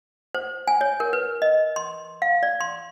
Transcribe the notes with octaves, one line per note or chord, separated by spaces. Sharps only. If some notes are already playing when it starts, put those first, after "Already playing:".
C5
G#5
C#5
A#4
B4
D#5
C6
F5
D5
C6